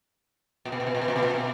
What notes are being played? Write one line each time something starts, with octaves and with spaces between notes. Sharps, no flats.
A#2
B2
A#2
B2
A#2
B2
A#2
B2
A#2
B2